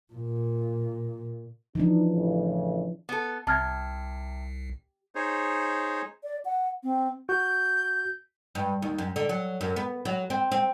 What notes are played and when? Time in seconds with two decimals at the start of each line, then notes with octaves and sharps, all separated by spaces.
0.13 A#2
1.75 E3 F3 D4 D#4
2.12 A1 C#3
3.09 B3 A4
3.47 C2 C3 A5 F6 G#6
5.15 D#4 G#4 C5 C#5
6.23 D5
6.45 F#5
6.83 C4
7.29 F#4 G6
8.55 G2
8.82 D#2
8.98 F#2
9.16 D3
9.29 F#3
9.61 F#2
9.76 B3
10.05 F#3
10.30 C4
10.51 C4